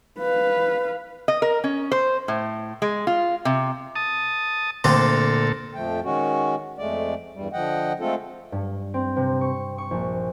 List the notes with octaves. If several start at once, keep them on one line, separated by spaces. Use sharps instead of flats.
B4 F5
D#5
A#4
C#4
C5
A2
G#3
F4
C3
A5 D#6
D2 A#2 D3 C4 A4
F2 F3 A3 G5
D#3 G#3 C#4 F#4
F2 G#3 A3 D5
E2 G2 G3
D3 F3 D#5 F#5 G5
G#3 A3 C4 F4 A4
G2
C4
C3
C#6
C#6
A#1